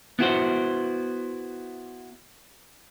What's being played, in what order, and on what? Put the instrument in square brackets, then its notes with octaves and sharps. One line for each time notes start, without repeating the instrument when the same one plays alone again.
[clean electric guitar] B3 E4 F#4 C5